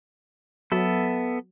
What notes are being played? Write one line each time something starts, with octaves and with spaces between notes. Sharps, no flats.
F#3 B3 A4 E5